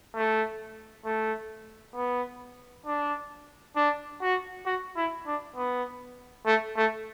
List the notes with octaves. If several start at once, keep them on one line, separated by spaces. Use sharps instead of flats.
A3
A3
B3
D4
D4
F#4
F#4
E4
D4
B3
A3
A3